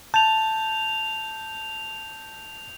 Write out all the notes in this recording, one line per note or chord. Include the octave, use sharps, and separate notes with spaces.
A5 G6 F7